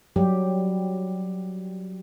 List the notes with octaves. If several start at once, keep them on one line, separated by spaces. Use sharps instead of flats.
F#3 G3 G4